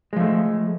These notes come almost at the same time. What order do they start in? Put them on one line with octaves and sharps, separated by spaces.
G#3 F3 A3